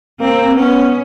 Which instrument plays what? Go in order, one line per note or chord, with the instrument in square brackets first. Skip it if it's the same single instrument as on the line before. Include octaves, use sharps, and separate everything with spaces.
[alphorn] A#3 [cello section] C4
[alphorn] B3 [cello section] C#4